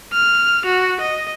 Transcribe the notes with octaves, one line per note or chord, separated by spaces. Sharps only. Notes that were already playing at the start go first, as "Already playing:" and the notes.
F6
F#4
D#5